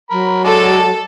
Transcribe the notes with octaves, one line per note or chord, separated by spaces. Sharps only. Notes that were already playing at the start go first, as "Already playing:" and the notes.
F#3 A#4 B5
G#3 A4 D5